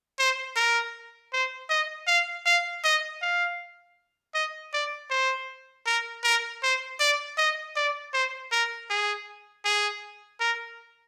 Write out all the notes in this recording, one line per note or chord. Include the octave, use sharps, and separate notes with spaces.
C5
A#4
C5
D#5
F5
F5
D#5
F5
D#5
D5
C5
A#4
A#4
C5
D5
D#5
D5
C5
A#4
G#4
G#4
A#4